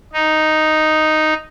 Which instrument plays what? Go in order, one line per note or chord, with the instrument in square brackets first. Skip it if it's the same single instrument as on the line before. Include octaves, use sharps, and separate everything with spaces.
[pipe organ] D#4